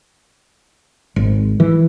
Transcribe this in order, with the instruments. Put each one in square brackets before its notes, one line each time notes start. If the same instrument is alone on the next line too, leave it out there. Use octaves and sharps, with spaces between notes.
[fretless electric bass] G#1
E3